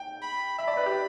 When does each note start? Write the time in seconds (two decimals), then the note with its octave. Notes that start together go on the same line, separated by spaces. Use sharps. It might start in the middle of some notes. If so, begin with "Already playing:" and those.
Already playing: G5
0.22 B5
0.58 E5 B5
0.68 D5
0.77 B4
0.86 G4